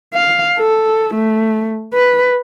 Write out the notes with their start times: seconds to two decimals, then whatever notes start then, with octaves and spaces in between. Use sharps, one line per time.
0.14 F5
0.58 A4
1.15 A3
1.94 B4